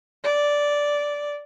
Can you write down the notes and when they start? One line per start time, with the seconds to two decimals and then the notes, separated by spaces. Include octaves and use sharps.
0.24 D5